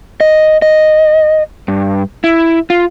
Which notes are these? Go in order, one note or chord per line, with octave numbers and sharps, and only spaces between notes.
D#5
D#5
G2
E4
F4